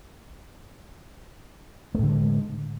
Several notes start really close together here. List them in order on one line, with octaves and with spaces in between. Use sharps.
A3 A2 D3 G#3